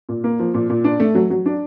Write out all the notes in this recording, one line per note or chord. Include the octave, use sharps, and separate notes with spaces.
A#2
A#3
F3
A#2
A#2
D4
A3
F#3
F#3
D4